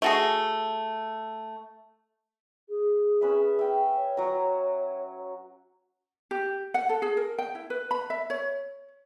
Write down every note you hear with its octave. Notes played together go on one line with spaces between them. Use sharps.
A3 F#4 G#4
G#4
C#4 B4 E5
E5 G5
C#5
F#3 A#5
G4
F#5
A4
G#4
A#4
G5
E4
B4
B5
E5
C#5